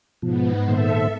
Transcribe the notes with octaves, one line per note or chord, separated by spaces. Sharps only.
G#2 B2 F3 B3
A#2 D#3 A4 C5 E5